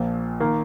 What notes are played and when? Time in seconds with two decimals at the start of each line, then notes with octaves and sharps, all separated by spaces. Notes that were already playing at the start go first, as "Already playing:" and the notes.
Already playing: A#1 A#2 F3
0.40 D#3 A#3